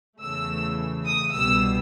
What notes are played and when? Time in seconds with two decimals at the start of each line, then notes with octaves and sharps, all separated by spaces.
0.21 E2 C#3 E3 A3 E6
1.06 D#6
1.33 C2 B2 G3 E6